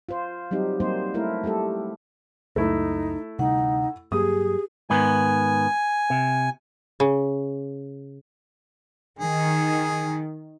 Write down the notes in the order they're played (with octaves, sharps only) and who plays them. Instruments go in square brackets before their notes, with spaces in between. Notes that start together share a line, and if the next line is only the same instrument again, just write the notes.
[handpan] F4 C5
F#3 G3 C4 D#4 G4
F#3 G3 A#3 C4 D#4 C5
A3 E4 A#4
G3 A3 G4 A4
[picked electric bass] C#2 F#2 [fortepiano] A3 E4 [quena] D#4
[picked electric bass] D2 C3 G3 [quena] D#4 [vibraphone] F#5
[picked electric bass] G2 F#3 A#3 [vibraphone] G4 [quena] G#4 [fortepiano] D#6
[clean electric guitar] G#2 D#3 B3 [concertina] G#5
[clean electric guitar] C3
[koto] C#3
[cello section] D#3 [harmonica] G#4